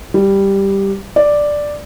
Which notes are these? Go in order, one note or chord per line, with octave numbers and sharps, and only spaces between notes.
G3
D5